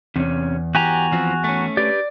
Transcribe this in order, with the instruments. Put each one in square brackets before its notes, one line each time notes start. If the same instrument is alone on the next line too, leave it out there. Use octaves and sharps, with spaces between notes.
[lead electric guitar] E2 [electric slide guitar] C3 C#4
[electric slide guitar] E2 [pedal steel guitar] F#4 G#5 A#5 [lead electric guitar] G4
[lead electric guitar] F3 C4
A3 C#4
[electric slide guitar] G4 B4 [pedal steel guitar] D5